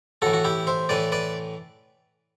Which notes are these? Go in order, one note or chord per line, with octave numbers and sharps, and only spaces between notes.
A2 E3 F#4 A4
F#4
E4 G4
C5 E5
A2 E3 B4 D5
B4 D5